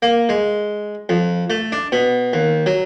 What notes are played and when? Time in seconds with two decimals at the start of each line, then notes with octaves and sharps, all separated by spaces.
0.02 A#3
0.29 G#3
1.09 F2
1.50 A3
1.72 D4
1.92 B2
2.33 D#2
2.66 F#3